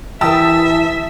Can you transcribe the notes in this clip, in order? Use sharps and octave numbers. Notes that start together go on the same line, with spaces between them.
E3 G4 A#4 E5 A5 D#6 E6